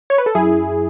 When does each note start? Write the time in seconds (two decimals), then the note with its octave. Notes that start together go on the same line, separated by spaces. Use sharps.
0.10 C#5
0.18 B4
0.26 A4
0.35 F#2 E4 G#4